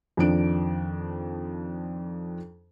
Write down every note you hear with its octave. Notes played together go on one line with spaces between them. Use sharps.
F2 D#3 F3 D4 D7